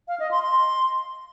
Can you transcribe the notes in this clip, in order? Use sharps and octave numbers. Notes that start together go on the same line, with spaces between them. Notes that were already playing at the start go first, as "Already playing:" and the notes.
F5
D#5
C6
C6